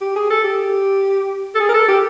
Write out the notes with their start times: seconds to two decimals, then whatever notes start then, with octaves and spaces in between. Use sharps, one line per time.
0.01 G4
0.16 G#4
0.30 A4
0.44 G4
1.55 A4
1.60 G#4
1.69 A#4
1.74 A4
1.89 G4